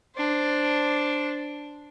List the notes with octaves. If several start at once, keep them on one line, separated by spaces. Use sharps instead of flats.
D4 C5